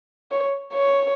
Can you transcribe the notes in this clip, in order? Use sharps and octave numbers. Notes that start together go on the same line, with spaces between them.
C#5
C#5